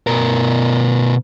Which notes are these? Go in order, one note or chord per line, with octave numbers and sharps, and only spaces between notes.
B2 A#4